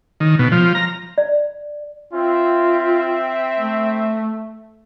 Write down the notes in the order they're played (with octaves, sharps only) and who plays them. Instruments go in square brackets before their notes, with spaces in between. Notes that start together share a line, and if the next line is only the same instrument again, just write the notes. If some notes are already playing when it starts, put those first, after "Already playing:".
[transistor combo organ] D#3
B2
F3
A#5
[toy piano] D5
[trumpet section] C4 E5 [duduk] F4
[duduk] A3